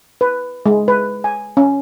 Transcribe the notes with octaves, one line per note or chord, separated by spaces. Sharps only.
B4
G#3
B4
G#5
C#4